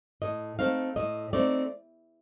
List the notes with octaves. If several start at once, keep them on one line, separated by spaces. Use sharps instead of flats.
A2 D#5
A3 C4 D#4 F5
A2 D#5
A3 C4 D#4 D5